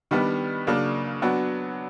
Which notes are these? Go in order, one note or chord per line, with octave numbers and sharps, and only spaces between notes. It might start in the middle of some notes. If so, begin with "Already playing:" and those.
D#3 G3 B3 D4
C#3 F#3 A#3 D4
F#3 B3 D4 F#4